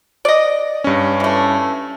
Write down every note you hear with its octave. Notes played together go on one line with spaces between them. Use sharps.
D5 D#5
G2 C#4
E3 A3